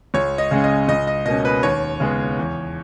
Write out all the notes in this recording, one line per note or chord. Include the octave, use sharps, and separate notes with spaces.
C#2 C#5
D#5
C#3 G#3 C#4
D#5
C#2 D#5
D#5
B2 A#3 C#4 D#5
B4
D#2 C#5
C#3 G#3 B3
E2